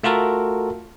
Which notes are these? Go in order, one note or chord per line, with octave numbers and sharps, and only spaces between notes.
A3 F4 F#4 A4 A#4